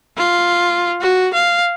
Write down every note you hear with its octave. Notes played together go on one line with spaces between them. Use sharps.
F4
F#4
F5